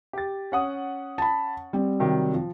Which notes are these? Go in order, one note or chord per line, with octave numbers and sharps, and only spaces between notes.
G4 A6
C#4 F#5 D#6
A5 B5
G3 C4
C3 D#3 F#3
F3